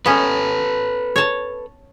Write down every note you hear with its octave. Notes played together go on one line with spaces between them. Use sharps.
B3 C#4 A4 B4
C#5 A5